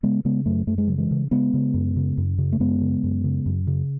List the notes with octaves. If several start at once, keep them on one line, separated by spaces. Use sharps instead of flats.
C#3 G#3 B3
C#3 G#3 B3
F#2 F#3 A3
F#2 A3
G#3
C#3 F#3
E3 G#3
C#3
C#3 G#3 B3
C#3
F#2
C#3
F#2
C#3
A3
F#2 G#3 B3
C#3
F#2
C#3
F#2
C#3